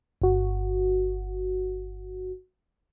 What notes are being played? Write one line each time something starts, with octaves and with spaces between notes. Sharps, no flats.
G1 F#4